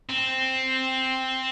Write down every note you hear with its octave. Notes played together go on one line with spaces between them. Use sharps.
C4